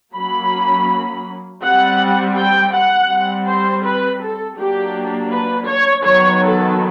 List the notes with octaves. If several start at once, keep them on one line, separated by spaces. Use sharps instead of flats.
F#3 A#3 C#4 B5
G3 C4 F#5
G5
F#5
G3 C4
C5
B4
A4
F#3 A#3 D4 G4
B4
C#5
D#3 F#3 B3 C#5
A4